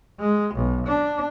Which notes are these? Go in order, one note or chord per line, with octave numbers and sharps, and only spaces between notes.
G#3
B1
D4